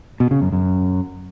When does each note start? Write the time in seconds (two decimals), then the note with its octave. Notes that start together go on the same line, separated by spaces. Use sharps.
0.20 B2
0.31 C#3
0.42 F#2
0.53 F#2